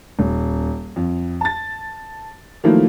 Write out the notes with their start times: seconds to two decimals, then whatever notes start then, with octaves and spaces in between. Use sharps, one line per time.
0.19 D#1
0.96 F2
1.41 A5 A6
2.64 D#3 F3 F#3 A3 A#3 E4